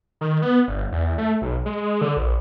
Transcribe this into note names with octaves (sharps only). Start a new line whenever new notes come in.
D#3
B3
G1
E2
A3
B1
G#3
D3
A#1